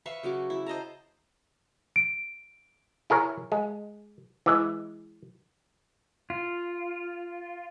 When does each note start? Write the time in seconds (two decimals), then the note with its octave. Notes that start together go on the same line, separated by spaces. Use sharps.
0.06 B4 E5 F5 C#6
0.23 C#3 F#3 F#4 D6
0.50 E4
0.66 C5 D#5 A5 A#5
1.96 D7
3.10 E4 G#4 A#4 C#5
3.52 G#3
4.46 E3 G#3
6.30 F4